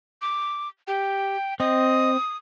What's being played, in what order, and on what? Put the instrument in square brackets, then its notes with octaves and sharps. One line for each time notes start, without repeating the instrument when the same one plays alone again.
[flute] D6
[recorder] G4 [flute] G5
[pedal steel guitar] C4 [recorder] D#5 [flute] D#6